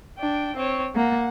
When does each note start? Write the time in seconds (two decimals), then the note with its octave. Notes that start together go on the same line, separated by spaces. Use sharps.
0.19 D4 G5
0.56 C4 C#5
0.95 A#3 F#5